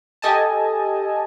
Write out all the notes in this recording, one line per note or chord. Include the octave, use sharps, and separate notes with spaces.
G4 A4 D#5 G#5 A5